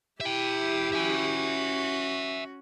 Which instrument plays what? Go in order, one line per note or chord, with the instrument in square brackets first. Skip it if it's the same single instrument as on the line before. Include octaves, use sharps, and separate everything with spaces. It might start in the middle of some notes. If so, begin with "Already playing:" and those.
[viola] E4 G4 [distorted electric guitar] E5 G5
[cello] C#4 F#4 [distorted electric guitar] E5 G#5